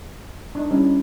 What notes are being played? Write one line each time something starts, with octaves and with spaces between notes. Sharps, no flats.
D4 D#4
G3 C#4 D#4 E4